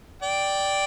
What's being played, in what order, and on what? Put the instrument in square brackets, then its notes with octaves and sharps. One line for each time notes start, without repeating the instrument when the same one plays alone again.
[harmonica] D5 G5